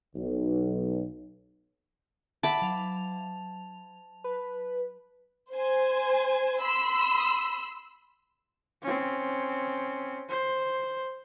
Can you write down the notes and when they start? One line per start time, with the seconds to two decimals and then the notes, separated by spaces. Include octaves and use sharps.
0.15 B1
2.43 E5 F#5 A5 B5 D6
2.62 F#3 F7
4.24 B4
5.54 C5 G#5
6.61 B5 C6 E6
8.82 C4 C#4
10.29 C5